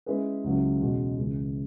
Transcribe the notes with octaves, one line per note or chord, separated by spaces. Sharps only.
G#3 C#4 E4 G#4 B4
C#2 C#3 F#3 C#4 E4
E2 B2 G#3 C#4 F#4
C#2 C#3 E3